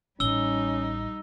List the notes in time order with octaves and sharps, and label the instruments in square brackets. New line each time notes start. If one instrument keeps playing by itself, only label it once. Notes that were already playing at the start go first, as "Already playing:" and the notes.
[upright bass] A1 [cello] G3 D#4 [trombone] C#4 [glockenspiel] E6 G7